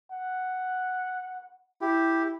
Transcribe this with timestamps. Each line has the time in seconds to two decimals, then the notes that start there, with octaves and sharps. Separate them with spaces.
0.11 F#5
1.81 E4 G4